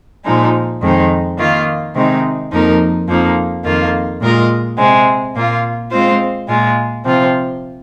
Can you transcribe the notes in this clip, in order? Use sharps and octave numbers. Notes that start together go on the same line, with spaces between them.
A#2 F3 G#3 D#4
F2 D#3 G#3 C4 D#4
D#3 A#3 F4
C3 D#3 G#3 C4 D#4
F2 F3 A#3 D#4 A#4
F2 F3 A#3 D#4
F2 D#3 A#3 F4
A#2 G#3 F4 A#4 D#5
C3 G#3 C4
A#2 A#3 F4
G#3 C4 F4 C5
A#2 G#3 F4
C3 F3 C4 F4